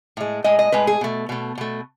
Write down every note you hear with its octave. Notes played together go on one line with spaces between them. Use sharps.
A2 G#3
A2 G#3 D#5
D#5
A2 G#3 B4
G#4
B2 A3
B2 A3
B2 A3